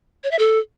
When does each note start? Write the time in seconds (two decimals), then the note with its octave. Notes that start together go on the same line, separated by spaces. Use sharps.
0.24 C#5
0.31 E5
0.39 A4